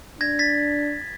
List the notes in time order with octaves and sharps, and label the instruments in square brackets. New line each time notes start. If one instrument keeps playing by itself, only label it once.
[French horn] D4 [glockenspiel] G#6 A#6
[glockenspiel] A6 B6